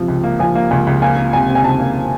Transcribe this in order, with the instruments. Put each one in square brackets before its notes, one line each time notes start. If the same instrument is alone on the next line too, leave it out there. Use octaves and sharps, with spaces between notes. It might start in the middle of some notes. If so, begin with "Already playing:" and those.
Already playing: [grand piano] C3 F3
C#2
A#3
[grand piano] F3 [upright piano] G#5
[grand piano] A#3
[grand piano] C#2 [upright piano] G#5
[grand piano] C#2
[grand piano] A#3 [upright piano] G#5
[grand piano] A#3
[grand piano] C3 [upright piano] G#5
[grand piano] C3
[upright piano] G#5
[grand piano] C#2 [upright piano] A5
[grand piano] A#3